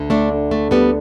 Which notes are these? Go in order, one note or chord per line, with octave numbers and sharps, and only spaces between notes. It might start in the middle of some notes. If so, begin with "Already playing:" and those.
Already playing: D2 D3
A3 D4
A3
G3 B3